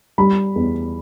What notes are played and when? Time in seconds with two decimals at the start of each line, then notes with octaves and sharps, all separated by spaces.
0.18 G3 B5
0.56 E2